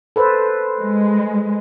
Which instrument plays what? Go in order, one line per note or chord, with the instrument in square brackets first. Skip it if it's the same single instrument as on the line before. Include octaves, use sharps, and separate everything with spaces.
[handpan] A4 B4 C5
[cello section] G#3